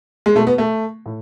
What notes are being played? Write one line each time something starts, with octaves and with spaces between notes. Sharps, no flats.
G#3
B2 A3
B3
A3
A2